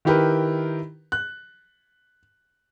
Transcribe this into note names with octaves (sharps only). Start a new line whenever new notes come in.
D#3 E4 G4 A#4 B4
F#6